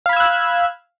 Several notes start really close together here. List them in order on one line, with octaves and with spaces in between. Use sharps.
F5 B5 G#6 E6 F#6